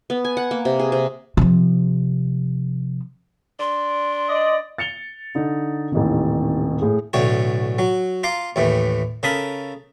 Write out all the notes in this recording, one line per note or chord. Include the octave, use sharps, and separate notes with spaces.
B3
G#5
F#5
A#3
C3
G#4
C3
C3 F3
D4 C6
D5 D#5
A6 C#7 F7 G7
D3 D#4
D#1 A1 C3 D#3
A2 G#4
B1 A2 D3 C#5
F#3
F4 F5 A#5 D6
D#2 A2 E3
C#3 A4 A#4 B5 D#6